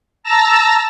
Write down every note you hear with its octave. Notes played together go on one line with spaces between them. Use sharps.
A5 A#5 E6 A#6